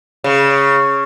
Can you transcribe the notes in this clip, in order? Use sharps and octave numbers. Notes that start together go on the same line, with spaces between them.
C#3